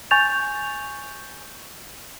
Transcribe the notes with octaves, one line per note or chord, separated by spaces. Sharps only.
G#5 C#6 G6 A6 F7